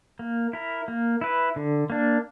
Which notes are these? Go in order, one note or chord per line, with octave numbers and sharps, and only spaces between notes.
A#3
E4 A#4
A#3
E4 B4
D3
A#3 D4